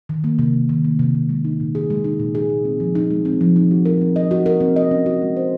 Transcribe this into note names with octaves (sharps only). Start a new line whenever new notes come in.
D#3
A#3
C3
C3
D#3
A#3
C3
C3
G#3
D#4
A#2
G#4
G#3
D#4
A#2
G#4
G#3
C4
F3
D#4
G#3
C4
F3
D#4
F#4
A#4
C4
D#5
F#4
A#4
C4
D#5
C#4
F#4
G#3
C5